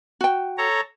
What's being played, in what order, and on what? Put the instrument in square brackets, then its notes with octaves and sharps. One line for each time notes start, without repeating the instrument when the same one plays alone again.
[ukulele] F#4 G5
[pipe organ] A4 C#5 A#5